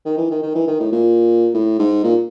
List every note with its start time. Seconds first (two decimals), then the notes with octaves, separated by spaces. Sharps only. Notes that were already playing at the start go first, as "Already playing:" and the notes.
0.06 D#3
0.18 E3
0.31 D#3
0.43 D#3
0.55 E3
0.67 D#3
0.80 A2
0.92 A#2
1.54 A2
1.79 G#2
2.03 A#2